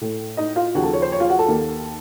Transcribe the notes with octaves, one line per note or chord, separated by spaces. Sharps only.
A2 A3
D#4 D#5
F4 F5
D#2 C#3 F3 F#4 F#5
A4 A5
C#5
C5
C#5
F4 F5
F#4 F#5
A4 A5
D#2 D#3 A#3